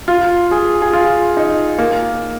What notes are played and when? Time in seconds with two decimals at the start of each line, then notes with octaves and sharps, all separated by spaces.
0.08 F4
0.51 G#4
0.82 G#4
0.93 F4
1.37 D#4
1.79 A#3